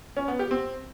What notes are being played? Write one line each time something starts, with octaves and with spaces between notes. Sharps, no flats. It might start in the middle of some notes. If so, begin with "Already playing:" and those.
C#4
B3
G4
C4